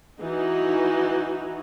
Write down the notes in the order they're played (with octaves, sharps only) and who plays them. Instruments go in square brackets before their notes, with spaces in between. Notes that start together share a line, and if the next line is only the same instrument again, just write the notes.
[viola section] E3 D#4 F#4